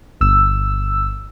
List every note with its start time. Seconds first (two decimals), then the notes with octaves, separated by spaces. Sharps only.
0.21 G1 E6